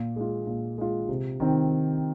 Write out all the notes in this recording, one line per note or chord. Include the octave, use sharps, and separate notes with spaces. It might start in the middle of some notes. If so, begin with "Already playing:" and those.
Already playing: A#2
G#3 F4
A#2
G#3 F4
C3
D#3 C4